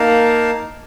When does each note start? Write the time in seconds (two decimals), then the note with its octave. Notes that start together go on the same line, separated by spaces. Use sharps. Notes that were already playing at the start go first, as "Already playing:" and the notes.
Already playing: A#3 D#4 A#4 F5 A5